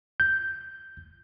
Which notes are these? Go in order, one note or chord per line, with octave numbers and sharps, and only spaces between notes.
G6